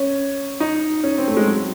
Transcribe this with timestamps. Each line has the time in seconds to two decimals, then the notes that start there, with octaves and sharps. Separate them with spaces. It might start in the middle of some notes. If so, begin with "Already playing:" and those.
Already playing: C#4
0.60 D#4
1.03 C#4
1.18 C4
1.28 A3
1.37 G#3
1.47 F#3